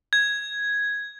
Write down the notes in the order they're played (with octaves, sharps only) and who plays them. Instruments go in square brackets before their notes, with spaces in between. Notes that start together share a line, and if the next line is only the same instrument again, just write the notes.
[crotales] G#6